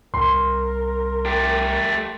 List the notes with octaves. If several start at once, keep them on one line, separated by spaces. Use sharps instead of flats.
C2 A#4 C6
A3 G4